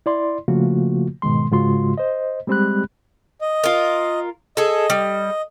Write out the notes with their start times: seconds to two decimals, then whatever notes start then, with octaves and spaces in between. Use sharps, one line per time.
0.06 E4 D5 C6
0.48 C#3 F3 A3 A#3 F4 F#4
1.22 G#2 B2 D#3 G#3 C6
1.51 G#2 C#3 G#3 F4 F#4 C6
1.98 C5 D#5
2.47 G3 G#3 C4 G4 B5 F#6
3.41 D#5
3.64 F4 A#4
4.57 G#4 A4 D#5
4.90 G3